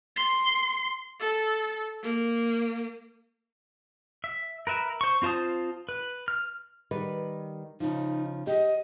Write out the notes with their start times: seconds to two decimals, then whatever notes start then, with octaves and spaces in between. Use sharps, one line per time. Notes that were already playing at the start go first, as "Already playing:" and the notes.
0.16 C6
1.20 A4
2.02 A#3
4.24 E5
4.67 A#4 B4 E5
5.01 C5 C#6
5.22 C4 F4 C5 A5 D#6
5.89 B4
6.28 F6
6.91 D#3 G3 B4
7.80 C#3 F3 D#4
8.47 G4 D#5